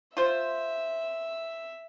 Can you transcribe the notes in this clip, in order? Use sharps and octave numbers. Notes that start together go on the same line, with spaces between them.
F4 C5 E5